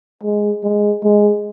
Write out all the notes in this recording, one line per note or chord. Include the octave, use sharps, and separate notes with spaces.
G#3
G#3
G#3